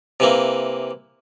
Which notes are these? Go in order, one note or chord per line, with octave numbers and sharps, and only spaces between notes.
C3 E3 A#3